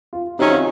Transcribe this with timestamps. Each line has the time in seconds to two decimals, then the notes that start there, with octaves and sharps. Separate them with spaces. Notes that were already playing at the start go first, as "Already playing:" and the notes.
0.13 F4
0.38 F2 C3 D#3 F#3 C#4 D#4
0.51 F4